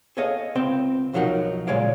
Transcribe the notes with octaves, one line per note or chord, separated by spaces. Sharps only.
G#4 A4 C#5 D#5 F5
C#2 C4 G5
B1 F3 F#3 D#4 A#4 F#5
A#2 C#3 G#3 C#5 D5 F5